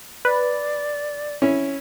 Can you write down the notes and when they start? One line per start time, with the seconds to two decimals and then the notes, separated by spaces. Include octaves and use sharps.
0.25 B4 D5
1.42 C#4 E4